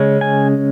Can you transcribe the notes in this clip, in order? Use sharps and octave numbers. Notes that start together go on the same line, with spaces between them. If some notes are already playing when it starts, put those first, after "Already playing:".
Already playing: C#3 G#3 C#4
G#5